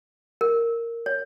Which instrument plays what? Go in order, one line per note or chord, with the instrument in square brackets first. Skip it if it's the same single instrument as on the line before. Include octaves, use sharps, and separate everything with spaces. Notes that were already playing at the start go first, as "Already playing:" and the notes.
[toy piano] A#4
C#5